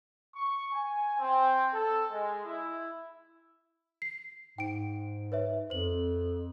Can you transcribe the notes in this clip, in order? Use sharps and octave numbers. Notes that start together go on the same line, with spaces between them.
C#6
G#5
C4
A4
G#3
E4
C7
G#2 G5 D7
B4 C#5 E5
F2 C5 F#7